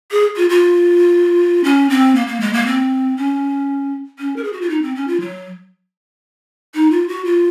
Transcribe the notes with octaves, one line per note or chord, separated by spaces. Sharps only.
G#4
F4
F4
C#4
C4
A#3
A#3
G#3
A#3
C4
C#4
C#4
A#4
G#4
F#4
F4
D#4
C4
C#4
F4
F#3
D#4
F4
F#4
F4